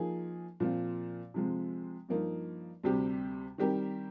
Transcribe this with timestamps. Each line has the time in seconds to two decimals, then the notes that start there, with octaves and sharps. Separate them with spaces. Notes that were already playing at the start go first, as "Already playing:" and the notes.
Already playing: F3 A#3 D#4 G#4
0.60 A#2 F3 C4 F4
1.34 C3 F3 G#3 C4
2.09 G2 F3 A#3 D#4
2.83 D2 C3 G3 C4 G4
3.58 D#3 G3 C4 G4 A#4